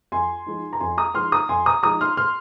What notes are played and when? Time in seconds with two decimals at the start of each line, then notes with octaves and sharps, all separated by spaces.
0.12 F2 G#5 C6
0.46 F3 G#3 D#4
0.73 A#5
0.80 F2 G#5 C6
0.98 A#5 D#6
1.15 F3 G#3 D#4 C6 F6
1.32 A#5 D#6
1.49 F2 G#5 C6
1.66 A#5 D#6
1.83 F3 G#3 D#4 A#5 D#6
2.01 C6 F6
2.17 C6 F6